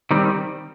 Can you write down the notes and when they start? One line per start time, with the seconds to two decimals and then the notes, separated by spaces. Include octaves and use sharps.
0.11 D#3 G3 C4